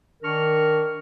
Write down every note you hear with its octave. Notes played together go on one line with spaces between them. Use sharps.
D#3 D4 A#4 C#6 F6